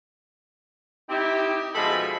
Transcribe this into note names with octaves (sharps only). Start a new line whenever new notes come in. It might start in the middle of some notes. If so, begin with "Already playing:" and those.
C4 D#4 E4 G4
B2 F3 G#3 A4 B5